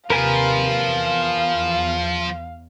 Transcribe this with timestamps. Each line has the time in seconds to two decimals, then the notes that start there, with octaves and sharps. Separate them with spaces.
0.10 D#2 C3 F3 F4 A#4 B4 F5 G#5
0.88 E2